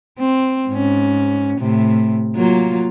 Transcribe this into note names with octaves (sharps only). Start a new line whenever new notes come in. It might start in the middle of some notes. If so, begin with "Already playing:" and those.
C4
G#2 C#4
A2 C3
F#3 A#3 F4